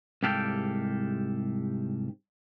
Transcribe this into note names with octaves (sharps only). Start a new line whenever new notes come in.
C2 G#2 G4 A4 F5 G5